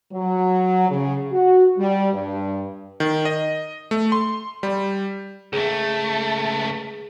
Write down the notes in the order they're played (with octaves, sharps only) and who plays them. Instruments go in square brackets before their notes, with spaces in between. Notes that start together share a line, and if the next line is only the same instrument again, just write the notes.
[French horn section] F#3
C#3
F#4
G3
G2
[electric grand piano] D#3
D#5
A3
C6
G3
[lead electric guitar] C#2 A3 [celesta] G#4